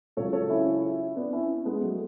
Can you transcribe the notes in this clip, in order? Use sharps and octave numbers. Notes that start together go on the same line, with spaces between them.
C#2 C#3 F#3 A4 C#5
A4 C#5
C#4 E4
B3 D4
C#4 E4
G#3 B3
F#3 A3